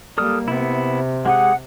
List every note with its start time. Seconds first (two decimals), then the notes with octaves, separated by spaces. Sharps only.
0.18 G3 A#3 A4 D#6 F6
0.48 C3 B3 E4
1.26 G#3 G4 G#4 F#5